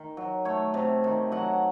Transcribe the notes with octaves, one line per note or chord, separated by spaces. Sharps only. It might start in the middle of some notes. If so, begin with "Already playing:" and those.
Already playing: D#3
F#3
A3 C#5
C3
D#3
F#3 F#5